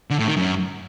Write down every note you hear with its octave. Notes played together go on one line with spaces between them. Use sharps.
D3
A2
D#3
F#2